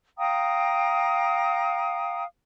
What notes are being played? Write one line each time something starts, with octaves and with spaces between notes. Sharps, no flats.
F5 G5 A#5 D#6